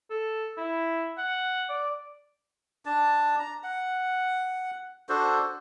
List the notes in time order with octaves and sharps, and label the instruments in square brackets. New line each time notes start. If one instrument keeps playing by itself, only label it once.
[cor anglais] A4
E4
F#5
D5
[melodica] D4 A5
A#5
F#5
D4 F#4 A4 C5